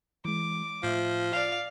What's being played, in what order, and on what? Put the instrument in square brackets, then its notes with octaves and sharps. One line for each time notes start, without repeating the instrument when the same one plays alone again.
[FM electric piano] E3 G#3 [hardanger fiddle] D6
[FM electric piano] A2 E5 [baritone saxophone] F3
[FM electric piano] F4 [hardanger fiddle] D5 F5